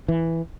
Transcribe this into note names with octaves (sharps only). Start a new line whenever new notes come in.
E3